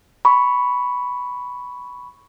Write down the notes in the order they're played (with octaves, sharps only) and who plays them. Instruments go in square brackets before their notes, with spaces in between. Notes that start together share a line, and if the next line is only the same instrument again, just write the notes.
[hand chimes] B5 C#6